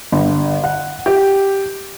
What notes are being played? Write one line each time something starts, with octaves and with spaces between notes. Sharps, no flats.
G1
F#5
G4